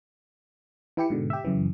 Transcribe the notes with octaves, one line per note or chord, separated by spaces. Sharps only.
E3 E4 G4 C#7
G#2 B2 D3
G4 E5
F#2 C#3 E3